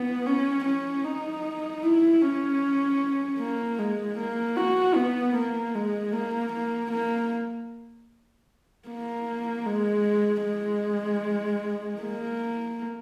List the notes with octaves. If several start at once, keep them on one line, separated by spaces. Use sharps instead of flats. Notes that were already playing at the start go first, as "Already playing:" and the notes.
Already playing: B3
C#4
C#4
D#4
E4
C#4
A#3
G#3
A#3
F#4
B3
A#3
G#3
A#3
A#3
A#3
A#3
G#3
G#3
A#3